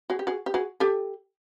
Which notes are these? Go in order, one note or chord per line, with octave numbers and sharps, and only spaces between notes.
F#4 G#4
G4
F#4 G#4
G4
F#4 G#4
G4 A4